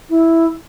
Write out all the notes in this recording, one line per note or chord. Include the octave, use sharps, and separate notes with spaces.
E4